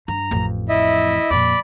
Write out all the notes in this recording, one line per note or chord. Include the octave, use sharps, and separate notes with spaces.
G2 A#5
A1 F2
E4 D#5 E5
F2 A#2 D5 B5 D6